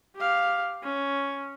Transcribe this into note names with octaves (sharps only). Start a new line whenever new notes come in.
G4 F5
C#4